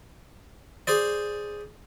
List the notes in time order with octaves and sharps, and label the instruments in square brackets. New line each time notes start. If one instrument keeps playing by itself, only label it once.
[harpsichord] G#4 C5 D5